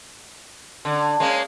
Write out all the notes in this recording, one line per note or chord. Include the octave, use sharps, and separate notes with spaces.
D3
G#3 A#3 C#4